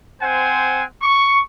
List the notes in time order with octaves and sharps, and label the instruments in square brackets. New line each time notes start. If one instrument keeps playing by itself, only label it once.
[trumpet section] C4 C5 F#5 G#5
C#6